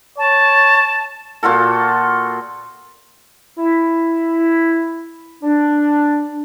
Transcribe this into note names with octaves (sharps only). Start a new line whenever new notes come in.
C#5 A5
A#2 F4 F#4 A4
E4
D4